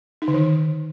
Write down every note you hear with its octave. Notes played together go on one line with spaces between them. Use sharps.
D#4
D3
D#3